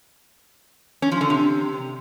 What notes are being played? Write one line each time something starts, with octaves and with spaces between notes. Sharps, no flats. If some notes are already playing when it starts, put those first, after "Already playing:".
C#4
F3
D3
C3